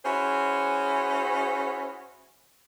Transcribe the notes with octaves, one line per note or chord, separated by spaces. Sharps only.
C#4 E4 F#4 G#4 C5